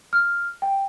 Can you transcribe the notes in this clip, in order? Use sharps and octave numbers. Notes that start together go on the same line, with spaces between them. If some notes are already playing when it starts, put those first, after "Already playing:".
F6
G5